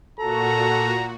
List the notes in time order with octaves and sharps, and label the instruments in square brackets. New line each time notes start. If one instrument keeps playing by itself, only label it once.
[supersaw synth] A#2 F#4 [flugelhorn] A4 [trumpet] A#5